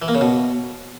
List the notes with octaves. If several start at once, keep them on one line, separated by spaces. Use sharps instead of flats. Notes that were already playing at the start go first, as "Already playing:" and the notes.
E3
A#3
C#3
B2